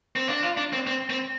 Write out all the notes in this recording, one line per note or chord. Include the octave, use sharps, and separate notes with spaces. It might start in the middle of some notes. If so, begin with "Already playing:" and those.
C4
D4
F4
D4
C4
C4
C4